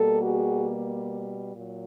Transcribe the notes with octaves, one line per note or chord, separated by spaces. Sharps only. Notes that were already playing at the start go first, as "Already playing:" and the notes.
Already playing: B2 G3 A#3 A4
F#4 G#4
A#2 F#3